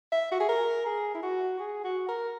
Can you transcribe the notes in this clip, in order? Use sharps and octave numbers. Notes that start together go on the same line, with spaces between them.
E5
F#4
G#4
A#4
G#4
E4
F#4
G#4
F#4
A#4